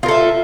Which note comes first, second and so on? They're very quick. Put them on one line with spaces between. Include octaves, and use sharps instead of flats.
F4 A#4 A4 E5